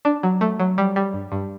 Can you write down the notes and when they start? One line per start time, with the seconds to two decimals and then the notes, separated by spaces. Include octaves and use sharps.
0.05 D4
0.23 F#3
0.41 A3
0.60 F#3
0.78 G3
0.96 G3
1.13 G2
1.32 G2